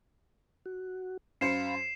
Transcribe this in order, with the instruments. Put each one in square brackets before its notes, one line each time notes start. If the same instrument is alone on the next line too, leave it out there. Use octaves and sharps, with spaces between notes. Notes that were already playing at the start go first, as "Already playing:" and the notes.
[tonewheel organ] F#4
[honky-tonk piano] F#2 C5 C#7 [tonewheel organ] F5 B5 [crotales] C7 E7